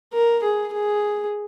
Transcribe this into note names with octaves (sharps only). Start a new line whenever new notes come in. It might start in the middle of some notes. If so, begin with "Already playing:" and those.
A#4
G#4
G#4